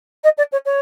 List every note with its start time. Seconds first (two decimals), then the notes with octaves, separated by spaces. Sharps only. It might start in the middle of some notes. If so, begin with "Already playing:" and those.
0.24 D#5
0.38 D5
0.52 C#5
0.66 C#5